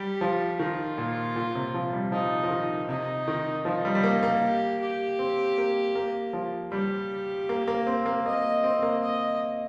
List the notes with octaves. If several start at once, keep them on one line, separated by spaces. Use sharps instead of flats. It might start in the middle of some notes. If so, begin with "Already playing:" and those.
Already playing: G3 G4
F3
D#3 F4
A#2
A#2
C3
F3
G3
F3 D#4
F3
D#3
C3 D#4
D#3
F3 D#4
G3
G3
A#3
A#3
G4
G4
C4
A#3
A#3
F3
G3 G4
A#3
A#3
C4
A#3
A#3 D#5
C4
A#3
D#5